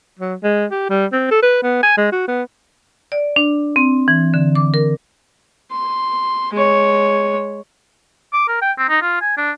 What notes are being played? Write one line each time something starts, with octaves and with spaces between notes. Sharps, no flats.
F#3
G#3
G4
G3
C4
A4
B4
B3
G#5
G#3
F#4
B3
D5
D4
C4
E3
D3
D6
A#4
C6
G#3 C#5
D6
A#4
G5
C4
D#4
F4
G#5
D4